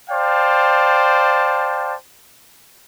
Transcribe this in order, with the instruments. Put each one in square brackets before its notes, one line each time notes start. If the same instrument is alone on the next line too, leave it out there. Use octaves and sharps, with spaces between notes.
[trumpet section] C5 D5 F5 G5 A5